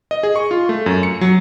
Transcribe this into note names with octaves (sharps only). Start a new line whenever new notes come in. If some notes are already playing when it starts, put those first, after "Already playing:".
D#5
G#4
C#6
F4
A3
F#2
C#7
F#3